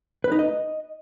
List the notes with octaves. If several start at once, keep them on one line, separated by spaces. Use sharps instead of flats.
B4
D#4
D#5